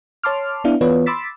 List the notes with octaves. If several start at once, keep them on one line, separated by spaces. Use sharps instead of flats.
C#5 A5 C6 D6 F6
B3 D4 E4 F5
E3 B3 F4 B4 C#5 D5
B5 C6 D6 E6 A6 B6